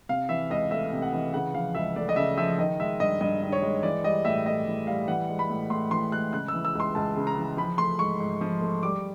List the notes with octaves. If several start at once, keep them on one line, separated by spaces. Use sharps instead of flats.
C3 F5
E3 E5
C#2 D#5
A3 E5
C3
F#5
E3
C#3 F#5
F3 F5
C#2 E5
A3 D5
D#5
C#3 E5
F3 E5
D#3 D#5
G#3 E5
G2 D#5
G2 D#5
D#3
C#5
G#3
E3 D5
G3 D#5
A2 E5
A2 D#5
E3
G3 F5
E3 F#5
G#3
B5
A2
A2 C6
E3 C6
G#3 F#6
C#3 F#6
E6
E3
E6
C#2 C6
C#2 A5
C#3
A#5
E3
F3 B5
A3 C6
G#2 C#6
G#2
F3
A3
G3 D6